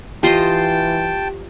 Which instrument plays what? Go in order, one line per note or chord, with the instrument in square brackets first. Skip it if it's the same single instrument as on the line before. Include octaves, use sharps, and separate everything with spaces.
[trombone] E3 [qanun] F4 C5 D#5 [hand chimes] G4 [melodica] G5 A5